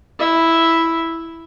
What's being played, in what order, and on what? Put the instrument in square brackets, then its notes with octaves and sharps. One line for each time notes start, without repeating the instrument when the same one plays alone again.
[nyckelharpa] E4 E5